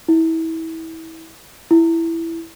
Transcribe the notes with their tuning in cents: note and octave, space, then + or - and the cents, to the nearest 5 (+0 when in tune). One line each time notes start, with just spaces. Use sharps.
E4 -25
E4 +5